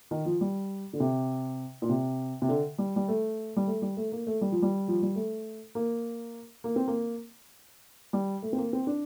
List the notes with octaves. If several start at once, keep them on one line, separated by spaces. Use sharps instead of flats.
D#3
F3
G3
D3
C3
A#2
C3
C3
D3
G3
G3
A3
G3
A3
G3
A3
A#3
A3
G3
F3
G3
F3
G3
A3
A#3
A#3
C4
A#3
G3
A3
C4
A#3
C4
D4